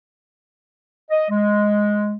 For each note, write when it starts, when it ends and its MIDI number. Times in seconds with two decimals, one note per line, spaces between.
1.11 1.26 75
1.31 2.17 56